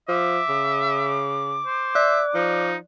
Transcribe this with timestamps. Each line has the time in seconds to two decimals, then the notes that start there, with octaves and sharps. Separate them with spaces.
0.08 F3 E5 D6
0.49 C#3
1.66 C5
1.95 D5 E5 F#6
2.34 F3 D#4